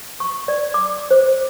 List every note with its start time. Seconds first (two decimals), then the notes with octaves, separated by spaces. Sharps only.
0.20 C#6
0.48 D5
0.74 D6
1.11 C5